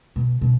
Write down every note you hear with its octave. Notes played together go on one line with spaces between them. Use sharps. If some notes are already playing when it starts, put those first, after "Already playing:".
B2
B2